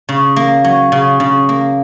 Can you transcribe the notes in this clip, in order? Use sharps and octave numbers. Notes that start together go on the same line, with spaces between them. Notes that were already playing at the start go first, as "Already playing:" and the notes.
C#3
A#3
F#3
C#3
C#3
A#3